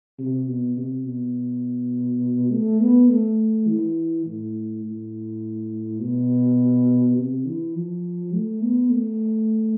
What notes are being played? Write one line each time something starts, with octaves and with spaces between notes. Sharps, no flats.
C3
B2
C3
B2
A3
B3
A3
E3
A2
A2
B2
C3
E3
F3
A3
B3
A3